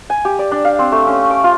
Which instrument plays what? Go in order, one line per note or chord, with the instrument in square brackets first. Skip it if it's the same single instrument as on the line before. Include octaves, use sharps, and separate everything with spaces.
[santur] G#5
G4
D5
D4
F5
C4
A3
C#4
D6
F4